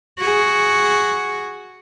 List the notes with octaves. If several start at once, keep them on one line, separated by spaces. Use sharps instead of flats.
F#4 G#4